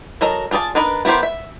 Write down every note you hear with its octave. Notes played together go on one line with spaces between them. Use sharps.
F#3 A4 A#4 D#5
D4 F4 G#4 D5 A5
D4 D#4 A#4 B4
B3 E4 G4 A#4 C5
E5